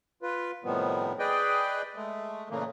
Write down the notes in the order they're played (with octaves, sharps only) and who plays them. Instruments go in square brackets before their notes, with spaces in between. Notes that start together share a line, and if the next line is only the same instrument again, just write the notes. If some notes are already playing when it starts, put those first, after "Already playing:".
[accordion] F4 B4
A2 C3 D#3 F3 G3 B3
G#4 B4 D5 D#5 G5
G#3 A3
A#2 C#3 E3 A3 A#3